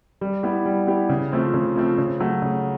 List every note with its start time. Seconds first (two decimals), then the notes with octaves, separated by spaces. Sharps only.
0.21 G3
0.43 B3 E4 G4
0.66 G3
0.87 B3 E4 G4
1.09 C#3
1.32 F3 A3 C4
1.54 C#3
1.76 F3 A3 C4
1.98 C#3
2.20 F#3 A3
2.42 C#3